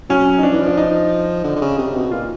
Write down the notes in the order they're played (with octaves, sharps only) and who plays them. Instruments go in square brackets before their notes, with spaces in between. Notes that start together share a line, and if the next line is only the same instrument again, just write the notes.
[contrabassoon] F#3 [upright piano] C#4
[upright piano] D#4
[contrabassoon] F3 [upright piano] D4
[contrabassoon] E3
F3
[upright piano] D4
D#4
[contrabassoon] D3
D3
C#3
C3
B2
[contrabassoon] A#2 [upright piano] F4